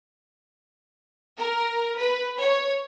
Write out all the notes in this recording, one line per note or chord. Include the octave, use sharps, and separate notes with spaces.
A#4
B4
C#5